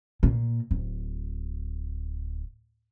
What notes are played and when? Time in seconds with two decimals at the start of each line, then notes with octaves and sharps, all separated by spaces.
0.23 A#2
0.71 D1